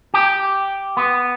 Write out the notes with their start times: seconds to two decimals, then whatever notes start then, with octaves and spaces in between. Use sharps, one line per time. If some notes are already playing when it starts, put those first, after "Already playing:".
0.14 G4
0.97 B3